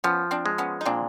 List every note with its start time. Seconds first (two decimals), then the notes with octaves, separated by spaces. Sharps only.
0.04 F3 B3 C#4
0.31 C4 D4
0.46 G#3
0.58 B3 C#4
0.81 D#4
0.85 A#2 C4 D4